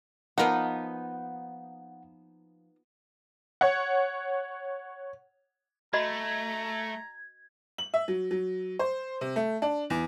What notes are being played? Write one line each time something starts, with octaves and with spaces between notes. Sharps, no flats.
F3 A#3 B3 D#4 A#4 B4 D#5 F#5
C#5 F#5
A3 F#4 D#5 A#5 B5 G#6
F#7
E5
F#3
F#3
C5
C3
A3
D4
E2